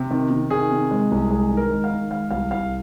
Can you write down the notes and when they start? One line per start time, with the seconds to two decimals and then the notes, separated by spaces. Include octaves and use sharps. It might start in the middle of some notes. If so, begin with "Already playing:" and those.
Already playing: C3
0.11 D#3
0.30 C3
0.50 D#3 G#4
0.71 C3
0.91 G#3
1.11 C2
1.30 G#3 G#4
1.51 D#3
1.57 A#4
1.71 G#3
1.84 F5
1.91 D#3
2.11 G#3 F5
2.31 C2 F5
2.51 C2 F5